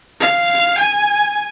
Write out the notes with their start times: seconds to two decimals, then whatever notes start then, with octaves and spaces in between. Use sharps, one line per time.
0.20 F5
0.78 G#5